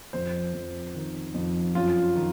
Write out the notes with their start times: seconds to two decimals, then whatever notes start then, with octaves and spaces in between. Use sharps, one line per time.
0.13 F2 C5
0.54 F2
0.94 D#3
1.34 F2
1.75 F#2 F4
2.15 D#3